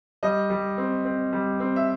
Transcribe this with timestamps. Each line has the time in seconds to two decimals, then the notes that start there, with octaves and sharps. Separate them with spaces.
0.23 G3 D#5
0.50 G3
0.78 C4
1.05 C4
1.33 G3
1.60 C4
1.76 E5